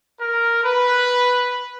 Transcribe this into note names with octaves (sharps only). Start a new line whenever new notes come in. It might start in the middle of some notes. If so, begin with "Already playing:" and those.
A#4
B4